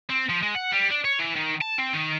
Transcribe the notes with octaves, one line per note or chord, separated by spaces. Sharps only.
C4
F3
G#3
F#5
G3
D4
C#5
E3
D#3
A5
C4
D#3